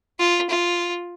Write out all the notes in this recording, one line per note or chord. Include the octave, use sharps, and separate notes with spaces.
F4
F4